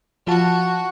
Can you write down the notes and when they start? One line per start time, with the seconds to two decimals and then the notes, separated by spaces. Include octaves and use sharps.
0.27 F3 F4 F#4 A5